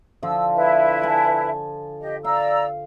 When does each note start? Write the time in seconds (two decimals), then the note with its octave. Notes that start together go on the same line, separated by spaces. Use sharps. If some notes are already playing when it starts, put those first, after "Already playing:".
0.23 D3 F3 F4 E6
0.55 E4 B4 E5
1.03 G#5 A5
2.01 G4 D#5
2.24 D5 F5 A#5 E6